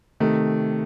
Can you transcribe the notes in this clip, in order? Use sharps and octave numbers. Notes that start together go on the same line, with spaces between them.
C3 D#3 A3